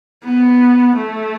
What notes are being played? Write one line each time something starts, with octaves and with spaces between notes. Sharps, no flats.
B3
A3